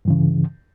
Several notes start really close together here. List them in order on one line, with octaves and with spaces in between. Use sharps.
G2 E3 C#3